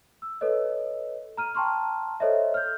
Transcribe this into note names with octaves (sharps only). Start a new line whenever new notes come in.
E6
A4 B4 C#5 D#5
A#5 F6 D#7
G5 A5 A#5 C6 C#6 F6
A4 C5 C#5 D#5 E5
F6 G6